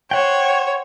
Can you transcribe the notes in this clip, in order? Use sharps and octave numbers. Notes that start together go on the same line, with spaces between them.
C5 C#5 F#5 G5